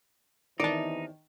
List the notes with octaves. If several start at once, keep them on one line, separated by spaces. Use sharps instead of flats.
E2 C3 D#3 E3 D#4 D5 A5